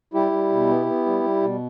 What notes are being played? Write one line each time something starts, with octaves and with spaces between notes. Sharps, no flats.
G3 E4 G4
G3
B2
B3
B3
G3
G3
B2